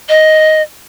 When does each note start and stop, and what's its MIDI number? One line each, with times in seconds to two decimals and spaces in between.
0.09 0.62 75